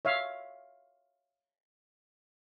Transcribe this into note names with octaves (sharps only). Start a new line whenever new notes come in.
C#5 E5 F5